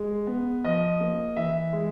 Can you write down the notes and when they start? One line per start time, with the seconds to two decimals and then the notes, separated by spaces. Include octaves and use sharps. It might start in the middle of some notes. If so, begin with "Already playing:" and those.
Already playing: G#3
0.27 B3
0.64 F3 D#5
1.00 A#3
1.36 E3 E5
1.73 G#3